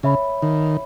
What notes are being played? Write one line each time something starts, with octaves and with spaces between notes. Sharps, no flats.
C#3 C#5 E5 B5
D#3